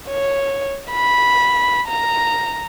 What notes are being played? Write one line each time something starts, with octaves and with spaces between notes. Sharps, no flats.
C#5
B5
A#5